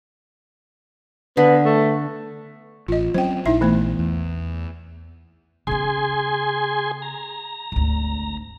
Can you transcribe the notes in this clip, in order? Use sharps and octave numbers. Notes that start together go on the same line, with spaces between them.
D3 B3
A3
A1 F4 D#5
F#3 C4 C#4 C5 G5
A#1 D#4 E4 E5
E3 A3 B3
E2
C#3 B3 G#4 G#5 C6
A#5
G#1 D2